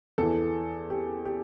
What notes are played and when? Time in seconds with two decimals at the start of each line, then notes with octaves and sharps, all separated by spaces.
0.18 E2 E3 A4
0.90 G4
1.25 G4